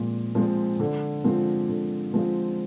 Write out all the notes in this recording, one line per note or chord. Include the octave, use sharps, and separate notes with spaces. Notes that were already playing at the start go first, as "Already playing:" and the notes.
Already playing: A#2 F3 G#3 C4
F3 G#3 C4
D3
F3 G#3 C4 F4
D3
F3 G#3 C4 F4